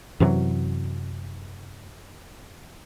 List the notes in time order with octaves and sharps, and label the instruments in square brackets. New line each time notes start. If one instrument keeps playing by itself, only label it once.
[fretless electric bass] F#2 C3 E3 F#3